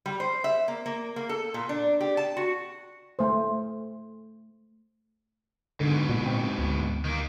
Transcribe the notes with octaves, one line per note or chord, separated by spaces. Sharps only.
G3
C5
E5
A#3
A#3
A#3
A4
A#2
D4
G4
A5
F#4
A3 C5
G#2 B2 D3
A#2
C4
D2
D#3 A#3